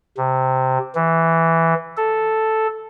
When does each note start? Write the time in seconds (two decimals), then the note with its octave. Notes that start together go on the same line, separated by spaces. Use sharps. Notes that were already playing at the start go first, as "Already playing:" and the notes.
0.17 C3
0.95 E3
1.97 A4